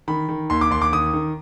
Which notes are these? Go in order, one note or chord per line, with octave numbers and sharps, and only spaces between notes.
D#3 B5
D#3
D#2 C6
D6
D#2 C6
D6
D#3 D#6
D#3